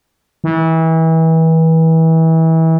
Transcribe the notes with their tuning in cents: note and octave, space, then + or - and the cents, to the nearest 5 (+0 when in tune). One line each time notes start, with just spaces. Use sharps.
E3 -30